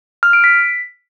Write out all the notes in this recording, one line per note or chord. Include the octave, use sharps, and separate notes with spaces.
F6
D7
B6